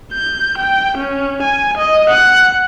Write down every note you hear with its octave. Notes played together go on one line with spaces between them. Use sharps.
G6
G5
C#4
G#5
D#5
F#5